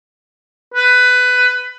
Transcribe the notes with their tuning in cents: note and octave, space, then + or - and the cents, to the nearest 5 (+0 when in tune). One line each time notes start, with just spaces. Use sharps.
B4 +15